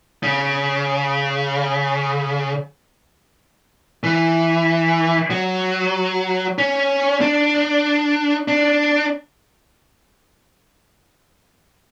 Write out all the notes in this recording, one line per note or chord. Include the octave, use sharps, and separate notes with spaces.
C#3
E3
F#3
C#4
D4
D4